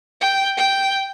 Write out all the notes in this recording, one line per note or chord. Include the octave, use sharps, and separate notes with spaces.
G5
G5